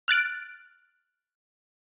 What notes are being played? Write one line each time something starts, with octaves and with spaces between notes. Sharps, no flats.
F6 F#6 A6 D7